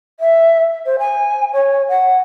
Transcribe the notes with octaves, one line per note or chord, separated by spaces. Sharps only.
E5
C5
G#5
C#5
F#5